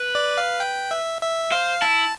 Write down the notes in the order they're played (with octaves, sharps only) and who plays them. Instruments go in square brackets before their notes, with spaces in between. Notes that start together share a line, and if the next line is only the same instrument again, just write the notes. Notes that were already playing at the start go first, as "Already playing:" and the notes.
Already playing: [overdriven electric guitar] B4
[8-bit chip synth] D5
F5
G5
E5
E5
[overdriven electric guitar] C5 [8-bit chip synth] F5
[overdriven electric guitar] E4 [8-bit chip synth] A5